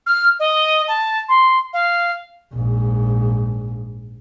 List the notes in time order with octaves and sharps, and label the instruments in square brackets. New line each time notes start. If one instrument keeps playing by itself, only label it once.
[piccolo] F6
D#5
A5
C6
F5
[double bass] A#1 G#2